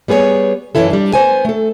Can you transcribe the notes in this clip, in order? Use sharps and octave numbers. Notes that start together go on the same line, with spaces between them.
G3 B3 G#4 B4 C#5
F#2 E3 F#3 E4 A4
G3 D4
B3 C5 G#5
A3 A4